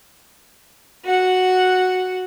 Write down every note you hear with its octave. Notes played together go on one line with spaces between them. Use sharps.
F#4 F#5